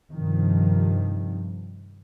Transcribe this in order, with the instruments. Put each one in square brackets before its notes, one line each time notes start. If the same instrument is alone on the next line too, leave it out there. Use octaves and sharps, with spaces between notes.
[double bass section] G2 C3 D#3 F3